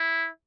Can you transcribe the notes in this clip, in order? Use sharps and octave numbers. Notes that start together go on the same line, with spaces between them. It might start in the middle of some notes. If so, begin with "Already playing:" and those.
Already playing: E4